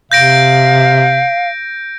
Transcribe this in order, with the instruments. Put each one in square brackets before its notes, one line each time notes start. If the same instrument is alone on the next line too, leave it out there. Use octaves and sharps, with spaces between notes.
[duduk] C3 [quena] F5 [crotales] G6 A#6 D7